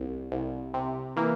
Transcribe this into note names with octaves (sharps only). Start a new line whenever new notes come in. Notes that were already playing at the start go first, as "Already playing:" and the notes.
Already playing: C2
C2
C3
E3 A#3